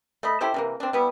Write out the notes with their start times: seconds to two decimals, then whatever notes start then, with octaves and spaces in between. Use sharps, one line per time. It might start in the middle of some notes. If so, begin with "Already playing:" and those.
0.23 A3 D#5 B5
0.41 E4 G4 A4 C5
0.54 C3 E3 A#3
0.80 C4 D4
0.93 G3 B3 E4